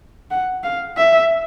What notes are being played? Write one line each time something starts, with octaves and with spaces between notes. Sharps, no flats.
F#5
F5
E5